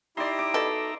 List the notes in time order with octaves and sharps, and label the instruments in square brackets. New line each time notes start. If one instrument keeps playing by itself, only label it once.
[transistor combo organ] D#4 E5 A#5 [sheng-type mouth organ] E4 G4 [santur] D5 C6
[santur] D6
[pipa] B2 A4